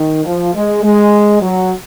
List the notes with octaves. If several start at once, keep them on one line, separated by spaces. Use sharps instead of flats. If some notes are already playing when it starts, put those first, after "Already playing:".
Already playing: D#3
F3
G#3
G#3
F#3